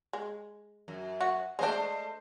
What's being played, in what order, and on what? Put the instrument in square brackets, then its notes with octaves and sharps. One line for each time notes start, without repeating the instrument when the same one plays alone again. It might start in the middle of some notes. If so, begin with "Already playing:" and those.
[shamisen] G#3
[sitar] F#2
[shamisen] F#4
[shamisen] G#3 D4 [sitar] A3 C5 D#5